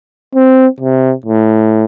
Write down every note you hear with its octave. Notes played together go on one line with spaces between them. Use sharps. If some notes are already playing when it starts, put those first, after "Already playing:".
C4
C3
A2